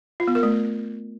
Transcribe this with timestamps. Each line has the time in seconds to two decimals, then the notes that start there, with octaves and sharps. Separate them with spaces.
0.20 F4
0.28 B3
0.35 A#4
0.43 A3